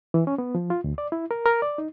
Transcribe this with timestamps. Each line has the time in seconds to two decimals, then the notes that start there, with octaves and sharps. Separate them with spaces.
0.14 E3
0.27 C#4
0.38 B3
0.55 F3
0.70 F4
0.84 D2
0.98 D5
1.12 E4
1.31 A#4
1.46 A#4
1.62 D5
1.78 D#4